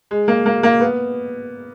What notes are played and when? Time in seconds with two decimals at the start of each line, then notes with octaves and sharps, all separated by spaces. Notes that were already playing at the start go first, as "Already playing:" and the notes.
0.11 G#3
0.28 A#3
0.46 A#3
0.63 A#3
0.81 B3